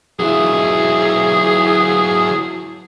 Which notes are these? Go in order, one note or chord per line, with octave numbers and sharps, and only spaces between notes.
F#3 E4 G#4